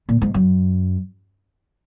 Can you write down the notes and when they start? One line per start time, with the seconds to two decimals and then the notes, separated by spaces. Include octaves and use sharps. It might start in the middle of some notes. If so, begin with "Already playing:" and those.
0.09 A#2
0.22 G#2
0.34 F#2